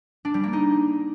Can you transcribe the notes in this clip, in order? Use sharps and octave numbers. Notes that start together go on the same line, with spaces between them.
D4
G3
A#3
D#4